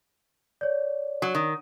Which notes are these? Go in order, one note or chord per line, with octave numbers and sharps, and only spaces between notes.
C#5 D5
F#3
D#3